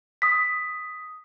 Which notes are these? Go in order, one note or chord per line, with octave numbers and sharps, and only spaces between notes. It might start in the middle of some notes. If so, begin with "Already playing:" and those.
D#6 B6